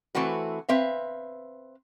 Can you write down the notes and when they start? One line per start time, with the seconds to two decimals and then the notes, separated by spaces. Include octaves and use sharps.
0.15 E3 A3 C4 F#4 B4
0.69 C4 B4 E5 F5